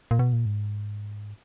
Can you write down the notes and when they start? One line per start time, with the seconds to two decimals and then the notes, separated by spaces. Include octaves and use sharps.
0.11 A#2
0.19 B2
0.33 A#2
0.46 G#2